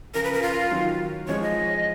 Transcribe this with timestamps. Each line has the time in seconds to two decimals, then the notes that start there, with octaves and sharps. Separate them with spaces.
0.14 C#3 F3 A#4
0.24 B4
0.34 A#4
0.42 F4
0.71 D#3 F#3
1.28 F3 G#3 C#5
1.43 D#5